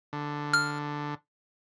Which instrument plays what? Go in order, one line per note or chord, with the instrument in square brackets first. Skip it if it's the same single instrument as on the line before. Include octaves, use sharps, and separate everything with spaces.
[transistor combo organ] D3
[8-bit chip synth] F6